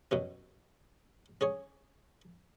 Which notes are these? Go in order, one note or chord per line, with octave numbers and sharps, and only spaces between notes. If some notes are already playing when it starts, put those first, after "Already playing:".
F#2 B2 C#4
C#4 G#4 C#5